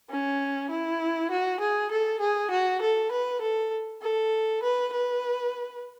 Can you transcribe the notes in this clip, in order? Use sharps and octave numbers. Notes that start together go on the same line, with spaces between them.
C#4
E4
F#4
G#4
A4
G#4
F#4
A4
B4
A4
A4
B4
B4